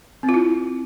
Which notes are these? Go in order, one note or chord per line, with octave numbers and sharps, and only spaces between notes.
C4
F4
E4